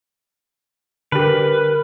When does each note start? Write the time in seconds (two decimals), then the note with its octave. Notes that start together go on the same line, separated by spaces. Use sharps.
1.12 D3 G4 A#4 B4